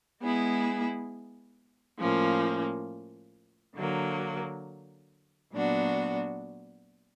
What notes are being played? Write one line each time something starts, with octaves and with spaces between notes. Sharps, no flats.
G#3 B3 E4 G#4
A2 F3 A#3 C#4
D3 F#3 A#3
A#2 F#3 B3 D4 F#4